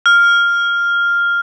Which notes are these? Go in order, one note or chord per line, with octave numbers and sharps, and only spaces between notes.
F6